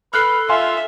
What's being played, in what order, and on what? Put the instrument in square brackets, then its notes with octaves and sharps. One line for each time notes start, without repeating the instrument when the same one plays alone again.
[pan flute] A4 [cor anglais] B4 [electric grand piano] F6 F#6 C7
[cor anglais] F4 [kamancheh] E5 [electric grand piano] F5 G#5 C6